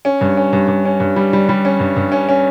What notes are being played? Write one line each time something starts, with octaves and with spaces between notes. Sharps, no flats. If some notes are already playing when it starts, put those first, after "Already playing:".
C#4
G2
C#4
G2
G2
C#4
G2
G3
G3
G3
C#4
G2
G2
C#4
C#4